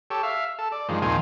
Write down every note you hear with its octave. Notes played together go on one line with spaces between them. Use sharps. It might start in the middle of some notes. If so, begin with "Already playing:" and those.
G4 A4 C#5
E5 F5
A4
D5
G2 D#3 F3 G#3
D#2 A#2 D#3 F3 C4 G#5